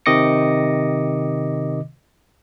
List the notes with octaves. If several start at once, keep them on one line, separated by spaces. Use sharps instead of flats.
C3 D#3 D#5 D6 A#6 C#7